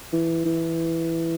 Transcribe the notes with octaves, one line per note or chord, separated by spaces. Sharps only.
E3
E3